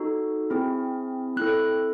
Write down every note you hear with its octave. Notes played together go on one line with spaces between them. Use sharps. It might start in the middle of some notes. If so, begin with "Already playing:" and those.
Already playing: D#4 F#4 A4
C4 E4 G#4
C4 E4 A4 F#6